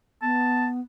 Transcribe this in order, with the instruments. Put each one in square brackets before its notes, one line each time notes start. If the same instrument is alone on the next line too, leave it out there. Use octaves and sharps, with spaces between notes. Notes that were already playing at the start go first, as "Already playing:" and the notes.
[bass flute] B3 [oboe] A5